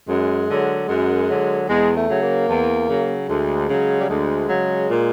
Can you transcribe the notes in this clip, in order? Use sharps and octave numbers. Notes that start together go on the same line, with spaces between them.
F#2 G#3
D3 F#3
F#2 G#3
D3 F#3
E2 G#3
A3
C#3 F#3
A#3
E2
C#3 F#3
D2 G#3
C#3 F#3
G3
D2 G#3
C#3 F#3
A#2